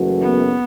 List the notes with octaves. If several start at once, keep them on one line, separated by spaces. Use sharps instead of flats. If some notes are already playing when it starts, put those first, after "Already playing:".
Already playing: F#1 F#2 E3 A3 F#4
B3